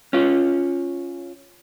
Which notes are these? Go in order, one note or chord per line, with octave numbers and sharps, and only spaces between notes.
C#4 F4